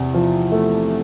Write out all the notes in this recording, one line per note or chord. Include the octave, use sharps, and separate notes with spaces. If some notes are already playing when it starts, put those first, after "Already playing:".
Already playing: E2 C3
F3
A3